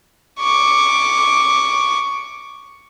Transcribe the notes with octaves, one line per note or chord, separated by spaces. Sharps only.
C#6 D6